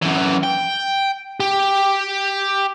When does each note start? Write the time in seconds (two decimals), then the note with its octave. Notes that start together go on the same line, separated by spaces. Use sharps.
0.02 F#2 E3
0.43 G5
1.40 G4